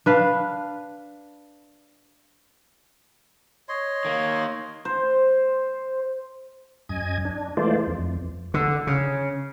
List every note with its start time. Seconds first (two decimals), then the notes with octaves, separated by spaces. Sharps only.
0.06 D4 B4 F5
3.69 C#5 D#5 C6
4.05 D#3 A#3
4.85 C5
6.89 F#2 D#5 G#5 G#6
7.25 D4
7.57 E3 G#3 A3 F4 C5 D5
7.87 F2
8.54 D3
8.87 C#3